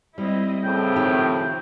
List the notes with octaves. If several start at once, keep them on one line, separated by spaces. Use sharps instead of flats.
G3 C4 E4 D#5
A2 C#3 C4 G5
D#3 F3 G4